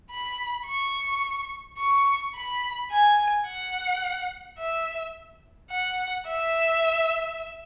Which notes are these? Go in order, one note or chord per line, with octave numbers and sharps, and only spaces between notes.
B5
C#6
C#6
B5
G#5
F#5
E5
F#5
E5